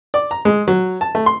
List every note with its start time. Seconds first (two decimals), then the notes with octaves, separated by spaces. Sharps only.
0.14 D5
0.31 A#5
0.45 G#3
0.68 F#3
1.01 A5
1.15 A3
1.26 C6